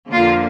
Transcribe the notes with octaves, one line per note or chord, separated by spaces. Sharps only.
F2 D3 A#3 F4